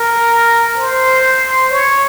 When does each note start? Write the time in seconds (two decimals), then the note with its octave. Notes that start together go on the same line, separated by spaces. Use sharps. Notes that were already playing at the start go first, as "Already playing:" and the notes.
Already playing: A#4
0.77 C5
1.71 C#5